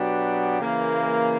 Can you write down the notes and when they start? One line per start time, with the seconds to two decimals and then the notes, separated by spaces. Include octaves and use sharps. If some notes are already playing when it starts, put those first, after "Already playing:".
Already playing: B2 F#3 B3 D4 G4
0.60 C#3 E3 A#3